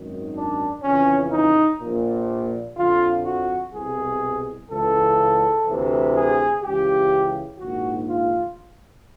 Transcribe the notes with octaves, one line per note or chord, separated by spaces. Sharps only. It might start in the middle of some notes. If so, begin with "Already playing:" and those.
Already playing: G#1 F#2 D#3
D4
F2 C#3 E3 C#4
D#4
A#1 A#2
F2 D3 F4
F#4
C2 B2 G#4
C#2 C#3 E3 A4
D2 C3 E3
G#4
C#2 C#3 E3 G4
A#1 G#2 D#3 F#4
F4